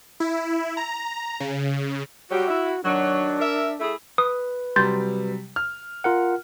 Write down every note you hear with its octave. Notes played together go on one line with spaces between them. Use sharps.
E4
A#5
C#3
F#3 G3 F#4 G4
E4
D#3 F#3 D4
A#4 E5
A3 E4 G#4
B4 D#6
C3 F#3 G3 C6 G6 A6
F6
F4 A#4 F#5